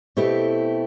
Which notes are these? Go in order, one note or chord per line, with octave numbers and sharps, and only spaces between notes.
B2 A3 C4 E4 G4